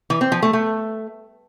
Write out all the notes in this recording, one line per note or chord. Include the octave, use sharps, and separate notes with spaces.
E3
C4
F3
A3
A3